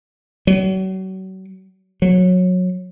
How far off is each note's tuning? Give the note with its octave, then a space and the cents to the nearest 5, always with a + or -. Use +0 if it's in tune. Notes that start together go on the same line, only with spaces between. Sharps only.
F#3 +35
F#3 -20